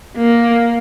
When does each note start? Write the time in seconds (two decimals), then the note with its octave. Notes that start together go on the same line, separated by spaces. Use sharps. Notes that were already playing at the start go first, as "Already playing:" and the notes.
0.17 A#3